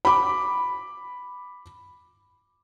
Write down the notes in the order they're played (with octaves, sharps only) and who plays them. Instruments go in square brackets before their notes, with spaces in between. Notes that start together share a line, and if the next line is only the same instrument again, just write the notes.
[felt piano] B5 D6